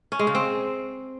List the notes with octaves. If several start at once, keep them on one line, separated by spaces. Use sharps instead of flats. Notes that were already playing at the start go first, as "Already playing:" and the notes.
C#4
G#3
C#3
C4